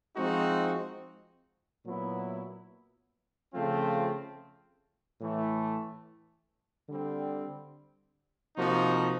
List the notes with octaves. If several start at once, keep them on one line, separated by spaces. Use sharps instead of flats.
F3 G#3 C4 D#4 F#4
A#2 F#3 B3 E4
C#3 F3 A3 C4 F4
A2 E3 A3
D3 G3 C4
C3 F3 A#3 D#4 F#4